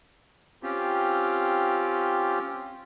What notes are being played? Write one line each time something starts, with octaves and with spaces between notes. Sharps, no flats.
C4 C#4 F4 G4